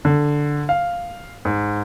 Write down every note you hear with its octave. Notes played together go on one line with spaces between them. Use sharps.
D3
F5
G#2